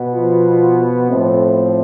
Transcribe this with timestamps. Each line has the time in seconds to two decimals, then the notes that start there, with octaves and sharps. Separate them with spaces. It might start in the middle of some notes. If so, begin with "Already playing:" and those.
Already playing: B2 B3
0.13 F3 F4
1.10 A2 F3 A3 C4